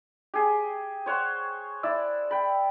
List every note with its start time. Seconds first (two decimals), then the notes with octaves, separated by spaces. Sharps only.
0.34 G4 G#4
1.06 C5 C#5 F#5 C6
1.83 E4 D5 E6
2.31 G5 B5